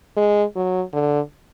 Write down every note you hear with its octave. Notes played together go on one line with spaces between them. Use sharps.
G#3
F#3
D3